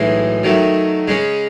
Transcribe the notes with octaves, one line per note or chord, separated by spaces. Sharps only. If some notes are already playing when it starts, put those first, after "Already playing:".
Already playing: B1 A2 E3 G#3
D#3 F#3 A3
C#3 G#3 C#4